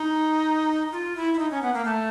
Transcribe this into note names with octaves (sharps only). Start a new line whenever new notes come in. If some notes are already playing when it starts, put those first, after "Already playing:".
Already playing: D#4
F4
E4
E4
D#4
C#4
B3
A#3
A3